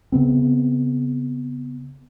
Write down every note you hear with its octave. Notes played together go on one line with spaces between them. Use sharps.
C#3 B3 C4